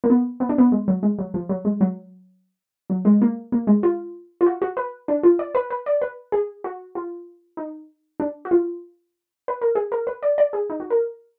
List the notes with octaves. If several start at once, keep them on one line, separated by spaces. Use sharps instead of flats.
A#3
B3
B3
D4
B3
G#3
F#3
G#3
F#3
F3
F#3
G#3
F#3
F#3
G#3
A#3
A#3
G#3
F4
F4
F#4
F#4
B4
D4
F4
D5
B4
B4
D5
B4
G#4
F#4
F4
D#4
D4
F#4
F4
B4
A#4
G#4
A#4
B4
D5
D5
G#4
D#4
F#4
A#4